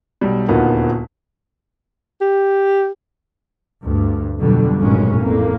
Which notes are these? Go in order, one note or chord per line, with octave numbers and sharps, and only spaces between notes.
B1 G3
D#1 D2 A#3 B3 D#4 F4
G4
D2 G2
F2 B2 D3 F#3 G3
F1 G2 A#2 F#3 G#3 C#4
A1 F2 A2 A#3